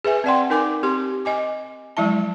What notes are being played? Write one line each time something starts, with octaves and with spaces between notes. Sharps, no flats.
G#4 B4 E5 G#5
C4 G#4 D5 F#5 G5 C6
D#4 A#4 G#5 D6
C4 G4 C6
D#5 G#5 D6
F3 F#3 G#3 E4 E5 A5